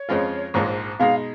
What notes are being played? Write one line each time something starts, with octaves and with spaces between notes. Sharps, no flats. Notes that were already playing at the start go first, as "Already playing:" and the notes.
Already playing: C#5
F2 F3 G#3 C#4 F4
A#1 G#2 F3 A#3
B2 G#3 D#4 F5